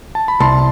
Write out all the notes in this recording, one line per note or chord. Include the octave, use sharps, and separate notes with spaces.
A5
B5
C2 A5 C6